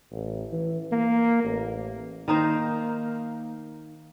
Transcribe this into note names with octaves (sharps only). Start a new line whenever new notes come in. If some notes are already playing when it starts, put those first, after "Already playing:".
A1
E3
A#3
A1
D#3 A#3 D#4 C5